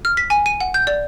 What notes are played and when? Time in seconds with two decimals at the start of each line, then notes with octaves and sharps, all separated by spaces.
0.05 F6
0.17 B6
0.30 G#5
0.46 D#7
0.60 F#5
0.74 G6
0.87 D5